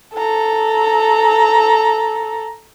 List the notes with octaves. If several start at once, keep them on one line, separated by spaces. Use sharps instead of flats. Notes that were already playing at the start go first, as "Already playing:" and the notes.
A4 A#5